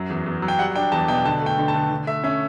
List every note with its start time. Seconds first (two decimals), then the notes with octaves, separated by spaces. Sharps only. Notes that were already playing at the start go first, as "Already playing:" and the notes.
Already playing: F#2 F#3
0.10 E2
0.26 E2
0.42 F#3
0.48 G5
0.59 G3 F#5
0.75 D4 G5
0.92 E2 A5
1.08 B2 G5
1.25 D3 A5
1.41 A3
1.46 G5
1.58 D3
1.68 A5
1.74 D3
1.91 D3
2.07 A3 E5
2.23 C#4 E5